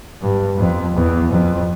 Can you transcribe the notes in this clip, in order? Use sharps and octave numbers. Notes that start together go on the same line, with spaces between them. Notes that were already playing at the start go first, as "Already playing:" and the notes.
G2
F2
E2
F2